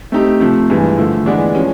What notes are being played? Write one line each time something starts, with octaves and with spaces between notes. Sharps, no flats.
A3 C4 D#4 G4
C3 F3 A3
G2 E3 G#3
D3 F3 A3
E3 G#3 B3 D4
F3 G#3 C#4